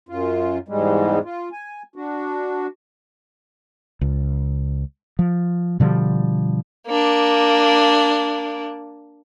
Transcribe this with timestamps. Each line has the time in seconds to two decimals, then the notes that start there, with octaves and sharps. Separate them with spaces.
0.09 F#2 F4
0.68 E2 G#2 G3 G#3
1.24 F4
1.52 G#5
1.96 D4 F#4
4.01 C#2
5.19 F3
5.80 B2 D3 F3 G3
6.87 A#3 D4